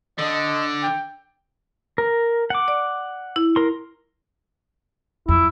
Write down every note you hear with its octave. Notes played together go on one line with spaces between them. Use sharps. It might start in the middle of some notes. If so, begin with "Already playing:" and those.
D3 D#5
G5
A#4
F#5 D6
D5
E4
A#4 C6
F2 E4